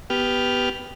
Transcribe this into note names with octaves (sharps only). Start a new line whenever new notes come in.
B3 G4 F6